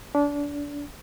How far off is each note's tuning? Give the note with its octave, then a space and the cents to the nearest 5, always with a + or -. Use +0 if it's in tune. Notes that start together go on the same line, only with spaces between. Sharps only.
D4 -25